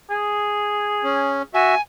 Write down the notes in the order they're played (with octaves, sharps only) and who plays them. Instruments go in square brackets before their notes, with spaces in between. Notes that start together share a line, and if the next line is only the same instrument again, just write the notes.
[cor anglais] G#4
[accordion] C#4
[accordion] F#4 E5 [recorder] G#5